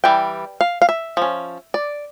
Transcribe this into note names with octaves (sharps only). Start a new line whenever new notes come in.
E3 G3 G5
F5
F5
E5
F3 C#4
D5